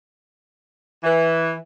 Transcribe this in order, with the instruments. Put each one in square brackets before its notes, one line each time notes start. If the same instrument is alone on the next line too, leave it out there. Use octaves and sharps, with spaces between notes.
[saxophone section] E3